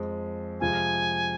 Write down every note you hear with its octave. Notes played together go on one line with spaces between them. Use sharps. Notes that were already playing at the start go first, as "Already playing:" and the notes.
Already playing: F2 F3 G#3
F2 C3 G#3 F4 G#5